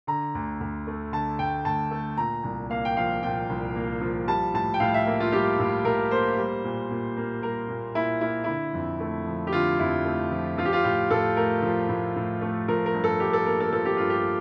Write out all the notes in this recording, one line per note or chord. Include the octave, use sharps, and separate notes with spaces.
D3 A#5
D2
D2
A3
D3 A5
D2 G5
D2 A5
A3
A#2 A#5
C2
A#3 F5
G5
F3 F5
A#2 G5
C2
A#3
F3
G3 A5
A2 A5
G5
A2 F5
E5
A#3
F4
G3 G4
A2
A2 A#4
A#3 C5
G3
A#2
A#2
A#3
G3 A#4
A#2
A#2 E4
A#3 E4
D3 E4
F2
A3
F3
G4
D3 F4
F2 E4
A3
F3
F3 F4
G4
F4
A2 G4
A2 A4
A3 A#4
F3
A2
A2
A3
F3 A#4
A#4
G2
A4
G2 G4
A4
A#3 A#4
A4
F3 A4
G4
G2 F4
G4